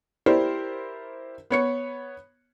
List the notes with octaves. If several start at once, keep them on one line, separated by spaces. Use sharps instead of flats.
E4 G4 A#4 C5 D5
B3 C#5 C#7